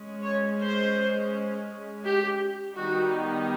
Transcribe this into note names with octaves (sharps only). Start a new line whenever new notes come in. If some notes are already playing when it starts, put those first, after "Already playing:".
Already playing: G#3 C#4
C#5
C5
G4
D#3 G3 B3 D#4 F#4